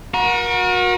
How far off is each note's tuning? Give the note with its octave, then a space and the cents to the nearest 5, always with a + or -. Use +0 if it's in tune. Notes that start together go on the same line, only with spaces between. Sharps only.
F#4 -30 A#4 +30